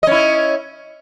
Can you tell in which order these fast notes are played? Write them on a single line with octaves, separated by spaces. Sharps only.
D#5 C#4 E4